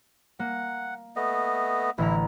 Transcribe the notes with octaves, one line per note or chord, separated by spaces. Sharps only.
A#3 F#5
A3 B3 D#5
A1 D3 E4 A#5